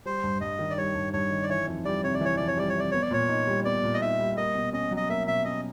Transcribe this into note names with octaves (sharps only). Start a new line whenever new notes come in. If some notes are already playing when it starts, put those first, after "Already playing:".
G3 C5
G2
G2 D#5
D#3
D5
G3 C#5
G2
G2 C#5
D#3
D5
E3 C#5
F2
G3 D5
C3 C#5
D5
E3 C#5
F2 D5
C#5
G3 D5
C#5
C3 D5
B3 C#5
D5
A#2 C#5
D#4
G3
B3 D5
A#2
D#5
D#4 E5
G3
A#3 D#5
B2
C#4 D#5
F#3
D#5
A#3 E5
B2 E5
C#4 D#5